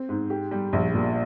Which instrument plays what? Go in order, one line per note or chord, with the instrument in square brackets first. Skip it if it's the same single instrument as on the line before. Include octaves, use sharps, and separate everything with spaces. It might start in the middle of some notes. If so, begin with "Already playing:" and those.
Already playing: [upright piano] C4
G#2
G4
G3
A#1
A#2